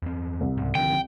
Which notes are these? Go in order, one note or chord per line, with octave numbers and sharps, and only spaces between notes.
E2 C4
C2
C#2 G#2
D3 D#3 F3 G5